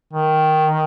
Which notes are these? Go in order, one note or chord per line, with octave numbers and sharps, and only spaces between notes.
D#3